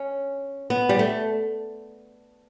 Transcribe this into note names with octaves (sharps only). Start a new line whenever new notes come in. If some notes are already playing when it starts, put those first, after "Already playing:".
Already playing: C#4
B3
G3
A3